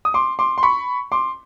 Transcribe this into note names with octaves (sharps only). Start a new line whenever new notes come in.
D#6
C6 D6
C6 D6
C6
B5 C#6
C6 D6